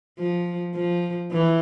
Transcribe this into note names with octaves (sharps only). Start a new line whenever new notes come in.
F3
F3
E3